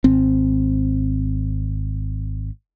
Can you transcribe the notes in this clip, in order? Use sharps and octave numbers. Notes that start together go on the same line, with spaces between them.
G#1 C4